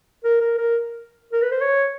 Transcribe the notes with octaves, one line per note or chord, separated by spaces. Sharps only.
A#4
A#4
A#4
A#4
B4
C5
C#5